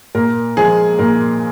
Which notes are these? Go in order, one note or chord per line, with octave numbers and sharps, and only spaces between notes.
A#2 A#4
F3 G#3 G#4
A#2 A#4